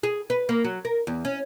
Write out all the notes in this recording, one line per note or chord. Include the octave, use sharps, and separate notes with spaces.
G#4
B4
A#3
F#3
A#4
E2
C#4